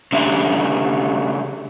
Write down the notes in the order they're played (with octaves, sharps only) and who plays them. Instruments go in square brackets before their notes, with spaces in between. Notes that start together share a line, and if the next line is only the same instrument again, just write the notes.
[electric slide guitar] C#3 A3 D4 G4 E5